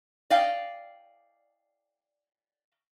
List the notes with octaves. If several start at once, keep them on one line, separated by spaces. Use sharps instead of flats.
D5 D#5 F5 G5